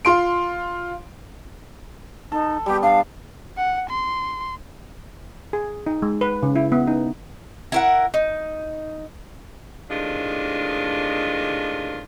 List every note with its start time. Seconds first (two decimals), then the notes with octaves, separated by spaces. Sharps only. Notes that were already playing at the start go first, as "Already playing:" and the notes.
0.05 F4 C6 D7
2.32 D#4 A4
2.66 G3 B3 G4
2.83 D4 F5
3.57 F#5
3.90 C6
5.53 G#4
5.87 D#4
6.02 G#3
6.21 B4
6.43 C#3
6.56 E4
6.72 B3
6.87 D#4
7.72 E4 A#4 F#5
8.14 D#4
9.90 A2 C3 D#3 G#3 D4 F4